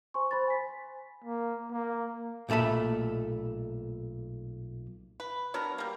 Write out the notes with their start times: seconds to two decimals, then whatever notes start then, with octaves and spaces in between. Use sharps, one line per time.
0.14 C5 G#5 C6 C#6
0.31 C5 B5 C6 A6
0.48 G#5 B6
1.24 A#3
1.72 A#3
2.49 B1 A#2 A3 A5 B5
5.20 B4
5.54 F#3 B3 D4 A#4
5.78 G3 A#3